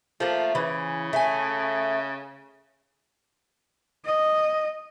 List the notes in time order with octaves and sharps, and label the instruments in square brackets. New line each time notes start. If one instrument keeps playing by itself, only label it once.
[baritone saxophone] F3 [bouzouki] A3 A#3
[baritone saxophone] C#3 [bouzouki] E3
[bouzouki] A3 G#5
[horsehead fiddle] D#5